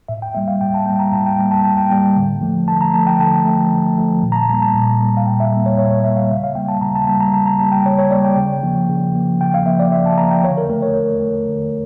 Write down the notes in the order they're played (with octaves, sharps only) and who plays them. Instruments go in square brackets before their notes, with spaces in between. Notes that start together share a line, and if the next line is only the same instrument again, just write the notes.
[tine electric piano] A2 E5
G5
G3 A#3 E5
F5
A2 G5
A5
G3 A#3 G5
A#5
A2 A5
G5
G3 A#3
A5
A2 A5
G5
G3 A#3 G5
D3
F3 A3
D3 A5
A#5
F3 A3 A5
G5
D3 A5
F3 A3
D3
F3 A3
A#2
A#5
A5
G3 A#3 A#5
A5
A#2
G3 A#3
F5
A#2 G5
E5
G3 A#3
C#5
A#2 C#5
C#5
G3 E5
A#3
F5
C#3 E5
F5
G3 A#3 G5
A5
C#3 A#5
A5
G3 A#3 A5
A#5
C#3 A5
A#5
G3 A#3 A5
G5
C#3 C#5
C#5
A#3 D5
G3
G5
C#3
F3 A#3
C#3
F3 A#3
C#3 G5
F5
F3 A#3 E5
D5
C#3 E5
A5
F3 A#3 A#5
G5
D3 C#5
A#4
A3 A#4
C#5
D3
A3
D3